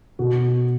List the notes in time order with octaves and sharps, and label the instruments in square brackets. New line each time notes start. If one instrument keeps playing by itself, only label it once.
[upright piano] B2 F#4